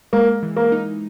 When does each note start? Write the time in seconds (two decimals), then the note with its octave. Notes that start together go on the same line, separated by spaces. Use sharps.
0.13 G#3 A#3
0.43 E3
0.56 A#3
0.72 D#4